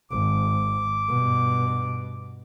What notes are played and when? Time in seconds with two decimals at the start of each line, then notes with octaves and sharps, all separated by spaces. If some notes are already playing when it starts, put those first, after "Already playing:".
0.11 G#1 D6
1.08 G2 B2